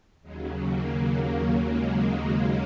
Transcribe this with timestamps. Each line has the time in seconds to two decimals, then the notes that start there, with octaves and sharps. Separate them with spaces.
0.22 D#2 C#3 F#3 G#3
0.56 A#3
0.90 A#3
1.56 G#3
2.23 G#3